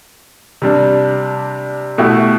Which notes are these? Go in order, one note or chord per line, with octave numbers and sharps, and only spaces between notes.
C3 G3 D4
B2 A3 E4 G4